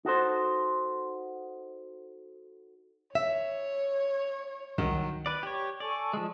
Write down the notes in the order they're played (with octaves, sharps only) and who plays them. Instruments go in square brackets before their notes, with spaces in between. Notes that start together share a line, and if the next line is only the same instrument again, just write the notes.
[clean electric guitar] D#4 F#4 A4 C5
[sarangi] C#5 [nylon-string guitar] E5
[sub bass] C2 [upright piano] D#3 [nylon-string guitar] F#3
[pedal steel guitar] B4 D5
G4 C#5
[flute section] A4 G#5 C#6 [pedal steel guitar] D5
[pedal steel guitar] F3 G#3